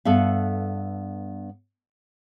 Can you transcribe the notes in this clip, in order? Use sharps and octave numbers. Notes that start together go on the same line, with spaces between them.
G2 B3 A4 E5 F5